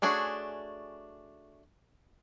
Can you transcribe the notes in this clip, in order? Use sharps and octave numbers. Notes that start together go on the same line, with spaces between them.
A3 C#4 D4 F#4 G#4